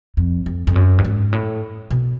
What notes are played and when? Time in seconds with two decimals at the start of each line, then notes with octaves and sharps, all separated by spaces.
0.17 F2
0.46 F2
0.67 F2
0.76 F#2
0.98 G2
1.05 G#2
1.33 A2
1.90 B2